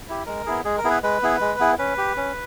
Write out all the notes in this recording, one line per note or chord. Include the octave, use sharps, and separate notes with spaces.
E4 G4
G#3 A#4
B3 E4 G#4
G#3 G#4
A#4
B3 E4 G#4
B4
G#3 B4
B3 E4 G#4
G#3
B3 E4 G#4
C#4 B4
G4
C#4